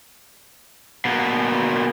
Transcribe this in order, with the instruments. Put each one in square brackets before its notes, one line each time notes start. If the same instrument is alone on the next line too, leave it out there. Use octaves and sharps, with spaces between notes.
[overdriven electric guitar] B2 A#3